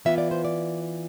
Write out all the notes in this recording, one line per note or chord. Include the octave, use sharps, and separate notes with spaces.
E3 B3 F4 E5
D5
C5
D5